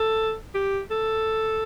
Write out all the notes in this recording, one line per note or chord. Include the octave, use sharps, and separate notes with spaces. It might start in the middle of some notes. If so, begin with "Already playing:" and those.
Already playing: A4
G4
A4